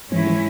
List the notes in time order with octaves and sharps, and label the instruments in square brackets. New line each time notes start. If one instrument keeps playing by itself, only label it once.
[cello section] G#2 G#3 C#4 E4 [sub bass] E3
[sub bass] E3